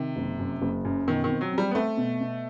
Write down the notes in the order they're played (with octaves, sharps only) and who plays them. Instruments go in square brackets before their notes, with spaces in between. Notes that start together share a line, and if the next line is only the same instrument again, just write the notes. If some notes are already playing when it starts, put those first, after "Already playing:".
Already playing: [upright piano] C3 [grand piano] D#3
[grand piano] F#1
F#2
F#1
F#2
[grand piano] B2 [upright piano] D#3
[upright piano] D#3
[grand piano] C4
[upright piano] F#3
[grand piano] C4
[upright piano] G3
B3
[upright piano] A3 [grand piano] C4
[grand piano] B2
B2